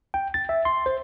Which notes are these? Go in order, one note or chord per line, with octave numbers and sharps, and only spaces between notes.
G5
A6
E5
C6
C5